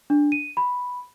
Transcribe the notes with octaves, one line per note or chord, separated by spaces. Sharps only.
D4
D#7
B5